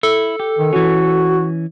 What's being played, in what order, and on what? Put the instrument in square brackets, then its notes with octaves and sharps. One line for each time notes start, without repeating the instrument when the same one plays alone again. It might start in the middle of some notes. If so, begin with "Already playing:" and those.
[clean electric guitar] E4 [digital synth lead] A4
[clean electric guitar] G4
[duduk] D#3
[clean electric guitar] E3 C#4 [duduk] F#4